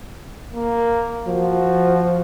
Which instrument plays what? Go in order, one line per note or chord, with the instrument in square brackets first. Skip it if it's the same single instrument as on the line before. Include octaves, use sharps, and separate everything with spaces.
[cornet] A#3
[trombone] F3 [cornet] F#4